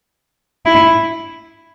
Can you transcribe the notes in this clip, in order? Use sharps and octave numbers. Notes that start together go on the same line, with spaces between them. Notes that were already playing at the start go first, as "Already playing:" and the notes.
E4